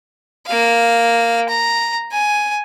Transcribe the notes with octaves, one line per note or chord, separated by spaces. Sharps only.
A#3 F5
A#5
G#5